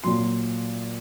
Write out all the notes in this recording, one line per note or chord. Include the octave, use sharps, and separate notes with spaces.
A#2 F#3 C6